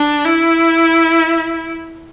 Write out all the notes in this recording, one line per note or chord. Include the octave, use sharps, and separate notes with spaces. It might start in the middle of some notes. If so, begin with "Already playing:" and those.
Already playing: D4
E4